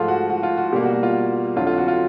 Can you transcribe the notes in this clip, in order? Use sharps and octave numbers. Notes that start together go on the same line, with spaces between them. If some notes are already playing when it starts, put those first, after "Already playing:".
Already playing: G#2 F3 A3 F4
F#4
F#4
F4
F#4
B2 G3 A#3 G4
F#4
F#4
F4
F2 D3 F#3 F4
F4
F#4
F4